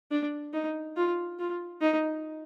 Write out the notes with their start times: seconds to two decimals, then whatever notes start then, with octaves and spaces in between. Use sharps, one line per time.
0.11 D4
0.53 D#4
0.96 F4
1.39 F4
1.82 D#4